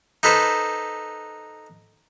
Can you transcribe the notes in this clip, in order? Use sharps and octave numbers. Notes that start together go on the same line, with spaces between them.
D#4 A4 B4 C5